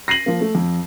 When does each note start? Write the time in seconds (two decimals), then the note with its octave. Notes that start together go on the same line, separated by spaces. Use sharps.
0.08 A#6 C7 D#7 F#7
0.26 F3 A#3
0.41 A3
0.55 F2